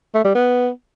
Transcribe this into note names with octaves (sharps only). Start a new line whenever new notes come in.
A3
G3
B3